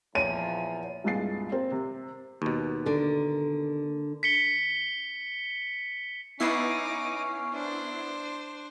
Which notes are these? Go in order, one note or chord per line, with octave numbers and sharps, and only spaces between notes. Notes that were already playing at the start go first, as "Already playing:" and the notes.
E2 A#2 F3 C#5 D#7
C2 G2 A#2 G#3 A6 C7
C4 A#4
C3
D#2 B2
D3 A#4
B6 C#7 G7
B3 C#4 D#4 E4 D6 C7
D4 C5